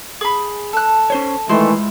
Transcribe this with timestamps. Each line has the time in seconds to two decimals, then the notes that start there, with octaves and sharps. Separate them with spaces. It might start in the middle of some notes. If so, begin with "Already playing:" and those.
0.21 G#4 B5
0.73 A4 F#6
1.10 C#4 C5 C#5
1.49 D#3 E3 G#3 A3 E4 F4 C6